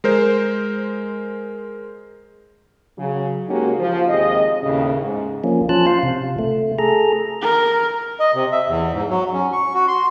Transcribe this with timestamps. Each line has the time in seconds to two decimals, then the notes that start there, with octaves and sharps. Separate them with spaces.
0.04 G#3 A#4 C5
2.98 C#3 F#3
3.49 G#3 A#3 C#4 D#4 F#4 G4
3.79 F3
4.08 D#2 C3 G#3 G#4 D#5
4.63 D#2 A2 C#3
5.02 G#2
5.44 F3 A#3 C#4
5.69 F3 C#4 F4 A5 F#6
5.87 F4 C5 F5
6.03 C3
6.39 A3
6.79 G#4 A4 A#5
7.42 A#4
8.20 D#5
8.34 C3
8.52 E5
8.68 E2
8.93 G#2
9.10 F#3
9.33 C#4
9.53 C#6
9.74 F#4
9.88 C6